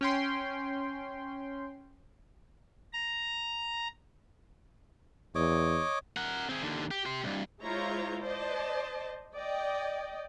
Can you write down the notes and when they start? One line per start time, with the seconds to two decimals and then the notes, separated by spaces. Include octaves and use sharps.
0.01 C#4 G5 C6
2.93 A#5
5.35 E2 C#5 D#5 D6
6.17 A#4 F#5
6.49 C4 G#4
6.63 D#2 D3
6.91 G4
7.06 G4 C6
7.24 C2 G2
7.62 G#3 E4 F4 C5 C#5 A#5
8.22 C5 D5 D#5 A5
9.36 D5 D#5 G5